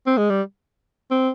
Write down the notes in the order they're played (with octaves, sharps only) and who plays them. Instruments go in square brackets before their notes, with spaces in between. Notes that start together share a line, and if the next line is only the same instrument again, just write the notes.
[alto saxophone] C4
G#3
G3
C4